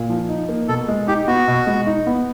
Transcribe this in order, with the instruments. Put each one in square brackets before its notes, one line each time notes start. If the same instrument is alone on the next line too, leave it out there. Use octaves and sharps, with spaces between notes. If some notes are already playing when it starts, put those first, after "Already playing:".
Already playing: [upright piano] A#2
F3
D#4
A#3
[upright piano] B2 [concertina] A4
[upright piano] G#3
[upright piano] D#4 [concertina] G4
[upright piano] B3 [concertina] F#4
[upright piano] B2
G#3
D#4
B3